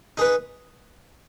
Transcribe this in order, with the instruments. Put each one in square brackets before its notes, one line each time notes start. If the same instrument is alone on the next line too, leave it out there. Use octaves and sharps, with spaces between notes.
[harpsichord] D#4 G#4 B4